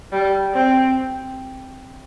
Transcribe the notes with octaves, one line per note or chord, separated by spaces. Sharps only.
G3
C4